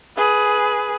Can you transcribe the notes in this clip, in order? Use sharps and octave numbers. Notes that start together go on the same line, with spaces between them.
G#4 B4